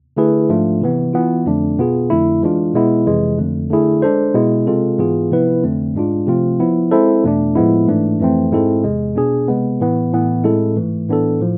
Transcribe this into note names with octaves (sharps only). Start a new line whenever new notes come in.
D3 A3 E4 G#4 B4
G#2 F3 A3 D4 F4
C3 E3 B3
E3 B3 F4
F2 D3 A3 D4
B2 B3 F4 G#4
F2 D3 A3 E4
E3 G#3 D4 F4
B2 G#3 B3 E4
F2 C3 E3 G#3
F2 D3 A3
D3 A3 E4 G#4
G#3 D4 A4 C5
B2 G#3 B3 E4
C3 G#3 C4 F4 A4
G#2 E3 B3 F4 G#4
C3 F3 B3 E4 B4
F2 D3 A3 C4
G#2 G#3 D4 F4
C3 F3 A3 C4 F4
F3 B3 E4
G#3 C4 E4 A4 C5
E2 B2 A3 D4
A2 F3 G#3 B3 E4
G#2 E3 A3 D4
F2 E3 A3 C4
G#2 G#3 C4 E4 A4
E2 C3 G#3
B2 B3 D4 G#4
C3 G#3 B3
A2 E3 B3
A2 E3 B3
A2 G#3 C4 E4 A4
G#2 E3 A3
A2 E3 B3 D4 A4
A2 F3